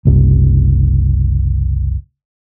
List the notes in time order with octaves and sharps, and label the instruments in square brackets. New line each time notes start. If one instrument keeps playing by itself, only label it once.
[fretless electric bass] F#1 C2